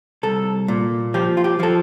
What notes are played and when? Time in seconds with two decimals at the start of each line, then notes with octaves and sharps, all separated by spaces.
0.23 C2 A4
0.68 A#2
1.14 F3 G4
1.37 F4
1.44 G4
1.60 F3 A4